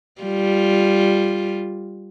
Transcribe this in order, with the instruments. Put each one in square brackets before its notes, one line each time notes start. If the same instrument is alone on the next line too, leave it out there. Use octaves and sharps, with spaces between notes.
[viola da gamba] G3 F4